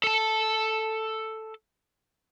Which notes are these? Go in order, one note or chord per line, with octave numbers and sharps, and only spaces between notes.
A4 A5